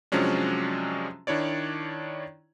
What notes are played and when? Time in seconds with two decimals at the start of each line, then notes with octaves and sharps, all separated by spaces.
0.12 C3 F3 F#3 G#3 C#4 D4
1.27 D#3 D4 E4 C#5 D5